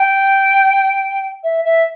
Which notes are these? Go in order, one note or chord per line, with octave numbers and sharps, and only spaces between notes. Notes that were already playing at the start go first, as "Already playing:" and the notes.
Already playing: G5
E5
E5